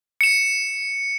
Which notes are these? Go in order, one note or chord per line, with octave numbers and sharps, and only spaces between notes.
C#7 E7